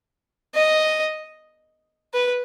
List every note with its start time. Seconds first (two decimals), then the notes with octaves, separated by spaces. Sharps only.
0.54 D#5
2.14 B4